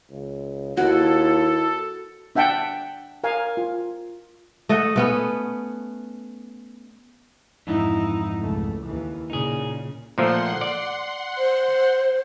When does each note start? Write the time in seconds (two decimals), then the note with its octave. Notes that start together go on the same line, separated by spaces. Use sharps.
0.11 C#2
0.77 D#2 E4 F#4 A4
2.35 D4 E5 F#5 G5 A5
3.24 A#4 F5 G#5
3.57 F4
4.69 A3 D#5 F#5
4.96 A3 B3 C#4
7.67 F2 G#2 E3 D#4 E4
8.42 C#2 A3
8.86 D#2 E3
9.30 A#2 C#3 D#4 G#4
10.18 A#2 F3 A3 F#5 C6
10.61 D5
11.37 C5